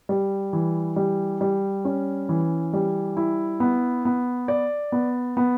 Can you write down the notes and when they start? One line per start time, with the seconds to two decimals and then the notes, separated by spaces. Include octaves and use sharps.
0.09 G3
0.53 E3
0.96 G3
1.41 G3
1.85 C#4
2.29 E3
2.73 G3
3.17 E4
3.60 B3
4.05 B3
4.48 D5
4.92 B3
5.37 B3